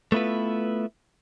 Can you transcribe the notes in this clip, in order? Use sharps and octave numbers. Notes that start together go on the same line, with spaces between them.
A3 B3 E4 F4 B4